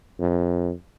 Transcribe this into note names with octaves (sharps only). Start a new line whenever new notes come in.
F2